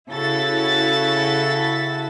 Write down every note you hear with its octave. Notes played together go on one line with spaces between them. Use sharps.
C#3 E4 F#4 A4 A6 B6